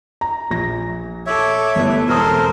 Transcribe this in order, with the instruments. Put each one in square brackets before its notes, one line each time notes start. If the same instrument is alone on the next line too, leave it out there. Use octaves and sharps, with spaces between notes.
[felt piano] A#5
A#1 A#6
[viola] A4 D6 [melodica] C#5 E5
[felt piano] G1 [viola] E3 A3
[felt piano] E1 D#6 [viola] C4 C5 [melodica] A4 A#4